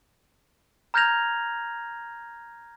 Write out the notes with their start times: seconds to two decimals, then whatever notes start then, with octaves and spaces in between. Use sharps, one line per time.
0.94 A#5 F6 G6 G#6 A#6 F7